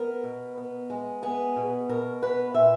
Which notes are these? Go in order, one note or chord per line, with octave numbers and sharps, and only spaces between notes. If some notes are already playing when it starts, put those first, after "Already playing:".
Already playing: B3 A#4
B2
B3
G#3
B3 G#4
B2
B2 A#4
B3 B4
A#2 E5